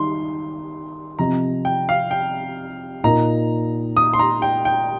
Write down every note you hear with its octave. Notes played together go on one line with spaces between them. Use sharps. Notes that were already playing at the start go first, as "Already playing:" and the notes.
Already playing: D#3 G3 D#4 C6
C3 F3 C4 G4 D#5 A#5
G5
F5
G5
A#2 A#3 D#4 A#4 D#5 A#5
D#6
C6
A#5
G5
G5